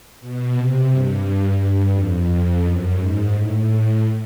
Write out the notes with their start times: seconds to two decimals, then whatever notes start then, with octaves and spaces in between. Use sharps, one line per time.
0.20 B2
0.55 C3
0.90 G2
1.58 G2
1.93 F2
2.62 F#2
2.96 G#2
3.32 A2